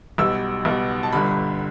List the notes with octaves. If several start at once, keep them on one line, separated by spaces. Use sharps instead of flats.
B1 B2 G3 E6
B1 B2 G3
A5
G1 G2 D3 G3 B5